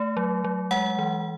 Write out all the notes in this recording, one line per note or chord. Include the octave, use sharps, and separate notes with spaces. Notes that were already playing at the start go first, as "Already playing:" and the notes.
Already playing: A3
F#3
F#3
G#3 F#5
E3